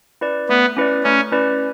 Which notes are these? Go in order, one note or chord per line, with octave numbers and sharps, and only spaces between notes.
C#4 E4 B4 D5
A3 B3
C#4 E4 B4 D5
A3 C#4
C#4 E4 B4 D5